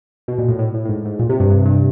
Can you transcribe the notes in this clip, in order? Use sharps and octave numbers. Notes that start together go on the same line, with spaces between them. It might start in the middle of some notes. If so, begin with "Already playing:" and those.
B2
A#2
A2
A2
A2
A2
G#2
G#2
A#2
C3
G2
G2
G2